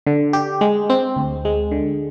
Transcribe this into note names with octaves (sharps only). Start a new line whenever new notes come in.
D3
G4
G#3
C4
D2
G#3
D3